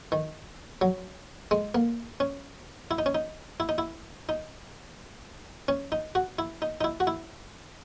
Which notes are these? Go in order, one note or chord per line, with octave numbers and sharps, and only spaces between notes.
D#3
F#3
G#3
A#3
C#4
E4
D#4
C#4
D#4
E4
D#4
E4
D#4
C#4
D#4
F#4
E4
D#4
D#4
E4
F#4
E4